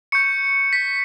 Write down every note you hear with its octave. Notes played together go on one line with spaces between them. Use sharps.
C#6 G6 C#7
B6